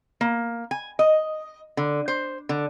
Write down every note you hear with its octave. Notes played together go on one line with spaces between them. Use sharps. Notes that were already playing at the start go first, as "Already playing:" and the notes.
A#3
G#5
D#5
D3
C5
D3